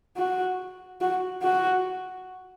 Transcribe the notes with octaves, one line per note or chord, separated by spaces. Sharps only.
F#4
F#4
F#4